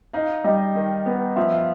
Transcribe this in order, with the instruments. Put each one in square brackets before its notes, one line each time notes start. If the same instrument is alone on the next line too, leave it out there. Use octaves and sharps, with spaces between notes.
[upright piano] D#4 [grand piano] F5
[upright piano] G3 [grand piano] D#5
[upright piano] D#3
B3
[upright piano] F3 [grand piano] E5
[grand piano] F5